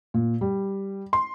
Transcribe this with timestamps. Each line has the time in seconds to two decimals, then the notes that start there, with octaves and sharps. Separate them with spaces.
0.14 A#2
0.41 G3
1.13 C6